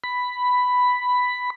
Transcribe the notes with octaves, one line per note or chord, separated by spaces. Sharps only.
B5